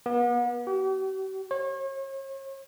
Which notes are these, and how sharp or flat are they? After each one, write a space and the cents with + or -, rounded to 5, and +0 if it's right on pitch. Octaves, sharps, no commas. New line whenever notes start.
B3 -40
G4 -45
C#5 -40